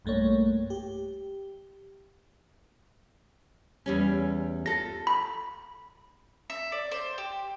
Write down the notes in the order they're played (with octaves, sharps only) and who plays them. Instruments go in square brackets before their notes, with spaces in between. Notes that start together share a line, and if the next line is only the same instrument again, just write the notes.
[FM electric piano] B1 G2 A3 A#3 C#5
G4
[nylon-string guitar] E2 G3 C#4
[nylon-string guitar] F4 A4 [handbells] A#6
[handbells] B5
[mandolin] E5
D5
C5
G4